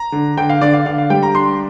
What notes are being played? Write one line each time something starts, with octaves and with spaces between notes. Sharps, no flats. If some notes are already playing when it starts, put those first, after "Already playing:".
Already playing: A#5
D3
D3 G5
F5
D3 D5
F5
D3 F5
F5
G3 G5
A#5
D4 C6